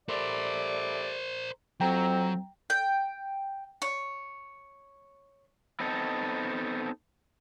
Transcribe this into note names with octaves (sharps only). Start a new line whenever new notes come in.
G3 A3 A#4 C5 D5
F2 F#3 C4 G5 A#5
G5
C#5
B3 C4 D#4 A4